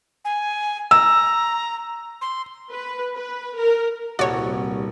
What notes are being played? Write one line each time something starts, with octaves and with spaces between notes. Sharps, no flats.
G#5
A#5 E6
C6
B4
B4
A#4
D#1 C2 F#4 C#5 D5